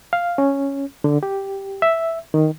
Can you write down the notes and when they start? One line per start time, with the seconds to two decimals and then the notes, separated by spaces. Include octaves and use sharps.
0.13 F5
0.38 C#4
1.04 D3
1.23 G4
1.82 E5
2.34 D#3